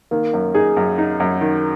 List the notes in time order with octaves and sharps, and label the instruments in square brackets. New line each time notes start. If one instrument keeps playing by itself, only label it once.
[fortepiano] D#3 [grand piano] A#3
[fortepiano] F#2
[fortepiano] D#4 [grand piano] G#4
[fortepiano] F#2
D#4
F#2
D#3